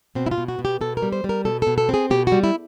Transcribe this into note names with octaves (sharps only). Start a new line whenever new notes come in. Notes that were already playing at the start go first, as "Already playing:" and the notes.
B2 C4
E4
F4
B2
F#4
B2
G4
B2 A4
A#4
G3
C5
G3
A#4
B2 A4
B2 A4
A4
C4 G#4
B2 G4
G3 F#4
E4